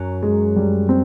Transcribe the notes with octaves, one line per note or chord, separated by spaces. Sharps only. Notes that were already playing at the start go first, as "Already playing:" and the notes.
Already playing: F#2 F#3
G#3
G3
C4